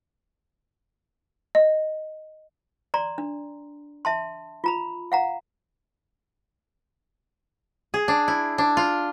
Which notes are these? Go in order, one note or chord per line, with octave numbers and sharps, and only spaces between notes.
D#5
D5 A#5 C6
D4
E5 A5 C6
F4 A#5 B5
F5 F#5 A#5
G#4
D4
E4
D4
F4